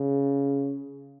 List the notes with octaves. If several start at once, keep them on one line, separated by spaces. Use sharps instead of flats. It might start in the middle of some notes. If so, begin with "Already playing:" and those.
Already playing: C#3